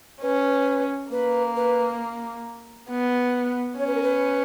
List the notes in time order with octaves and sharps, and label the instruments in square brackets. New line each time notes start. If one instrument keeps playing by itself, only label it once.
[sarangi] C#4 [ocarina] B4
[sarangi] A#3 [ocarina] B4
[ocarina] B4
[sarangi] B3
[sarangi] C#4 [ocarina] C#5
[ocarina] B4
A#4
B4